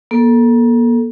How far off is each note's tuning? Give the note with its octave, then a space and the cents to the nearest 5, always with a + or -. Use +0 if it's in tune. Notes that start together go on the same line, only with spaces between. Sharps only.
A#3 +35 A4 +0